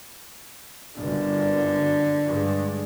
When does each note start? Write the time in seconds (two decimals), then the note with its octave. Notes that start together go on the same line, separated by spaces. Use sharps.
1.00 G1 F#2 D3
2.27 G2 G#3